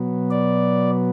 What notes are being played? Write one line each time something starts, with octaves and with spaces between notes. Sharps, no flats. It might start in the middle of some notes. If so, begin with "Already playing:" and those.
Already playing: B2 F#3 B3
D5